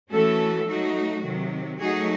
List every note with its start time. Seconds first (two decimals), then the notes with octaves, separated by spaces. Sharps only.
0.11 E3 A3 C#4 F#4 A4
0.67 F#3 A3 D#4 F#4
1.24 C3 D#3 F#3
1.80 F#3 A3 D#4 F#4 G#4